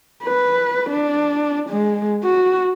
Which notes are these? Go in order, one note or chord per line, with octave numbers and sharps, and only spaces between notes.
B4
D4
G#3
F#4